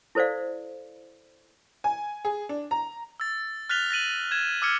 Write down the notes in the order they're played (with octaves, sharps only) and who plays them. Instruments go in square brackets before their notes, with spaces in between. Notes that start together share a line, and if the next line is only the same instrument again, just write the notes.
[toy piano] E4 A4 C5 D5 F5
[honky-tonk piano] G#5
G#4
D4
A#5
[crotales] E6 A6
F6 F#6 A6 B6 F7 G7
A6 A#6 D#7 F#7
G#6 E7
D6 E6 F6 G#6 C#7